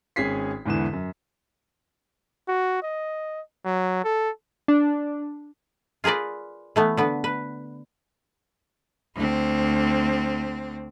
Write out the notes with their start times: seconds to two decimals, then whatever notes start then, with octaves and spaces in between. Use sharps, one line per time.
0.16 G#1 C#4 G#4 B6 C7
0.66 E2 G#2 D3 E3 E7
0.93 F#2
2.48 F#4
2.82 D#5
3.65 F#3
4.04 A4
4.68 D4
6.04 F4 G#4 A#4 B4 D5
6.76 E3 A3 B3
6.97 D3 B3 B4
7.24 B4
9.15 D2 C4